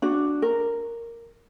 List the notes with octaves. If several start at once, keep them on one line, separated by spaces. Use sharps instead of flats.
D4 F#4
A#4